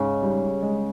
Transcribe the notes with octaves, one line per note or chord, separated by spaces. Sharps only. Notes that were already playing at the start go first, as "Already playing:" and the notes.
Already playing: G#2 C#3
G3
G#3